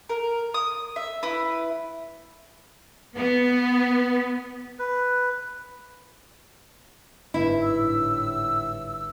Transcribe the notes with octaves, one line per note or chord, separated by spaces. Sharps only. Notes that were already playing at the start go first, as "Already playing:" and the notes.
A#4
D#6
E5
E4 B4
B3
B4
G1 G#2 E4
A2 E5 E6